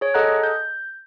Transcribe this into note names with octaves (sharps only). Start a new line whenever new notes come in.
G#4 C#5
G#4 A4 D#5 F#5 A#5 F#6
G6